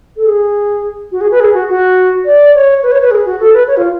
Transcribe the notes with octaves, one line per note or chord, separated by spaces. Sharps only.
A4
G#4
F#4
G#4
B4
G#4
F#4
F#4
D5
C#5
B4
C#5
B4
G#4
F#4
A4
B4
C#5
F4